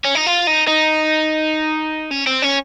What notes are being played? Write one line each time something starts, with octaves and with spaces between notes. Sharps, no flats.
C#4
D#4
F4
D#4
D#4
C#4
C4
C#4